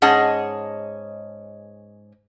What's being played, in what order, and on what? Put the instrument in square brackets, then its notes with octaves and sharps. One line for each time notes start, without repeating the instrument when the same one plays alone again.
[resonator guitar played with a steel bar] G#2 C#4 G#4 D#5 F#5 A5